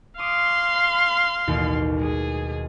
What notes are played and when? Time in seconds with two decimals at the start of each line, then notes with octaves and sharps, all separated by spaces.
0.19 F5 C6 D6 D#6
1.48 A1 D#2 B2
1.99 G#3 G#4